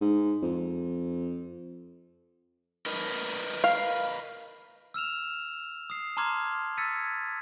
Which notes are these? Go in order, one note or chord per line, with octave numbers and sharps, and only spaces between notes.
G#2
F2
A#4 B4 D#5
F5
E6 F6 E7 F7
D#6 C7
A5 A#5 C6 D6 F6 G#6
E6 G#6 A6 B6 C#7 D#7